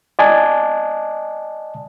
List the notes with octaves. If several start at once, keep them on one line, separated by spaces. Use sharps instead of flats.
D5 D#5 G#5 A5